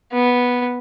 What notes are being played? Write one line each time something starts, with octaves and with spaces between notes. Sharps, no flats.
B3